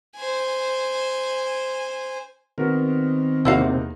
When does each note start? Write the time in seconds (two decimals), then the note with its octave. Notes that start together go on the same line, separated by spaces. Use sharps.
0.16 C5 G#5
2.58 D#3 B3 C4 F#4 A#4
3.45 E2 C3 A#3 D#4 E4 F#4 F5